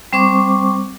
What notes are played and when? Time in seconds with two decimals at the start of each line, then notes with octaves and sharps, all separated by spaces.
0.13 G3 C4 C5 C#6 D6